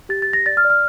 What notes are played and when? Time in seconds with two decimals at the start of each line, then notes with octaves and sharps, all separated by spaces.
0.09 G4 A6
0.22 A6
0.28 G4
0.33 A#6
0.46 D5 A6
0.57 F6
0.64 D5
0.70 F6